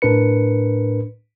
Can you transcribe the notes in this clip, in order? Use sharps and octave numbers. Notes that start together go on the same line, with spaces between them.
A2 D4 A#4 B4 C#7